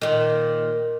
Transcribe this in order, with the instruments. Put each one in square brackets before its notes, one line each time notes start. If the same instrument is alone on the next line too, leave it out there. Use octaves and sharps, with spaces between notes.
[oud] A#2 D#3